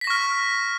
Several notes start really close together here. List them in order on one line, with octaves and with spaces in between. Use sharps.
B6 A#6 C#6 F6